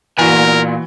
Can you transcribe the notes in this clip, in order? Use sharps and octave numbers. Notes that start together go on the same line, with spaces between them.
A#2 E3 F#4 A#4 G#5